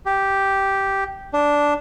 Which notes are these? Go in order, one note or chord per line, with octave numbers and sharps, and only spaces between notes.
G4
D4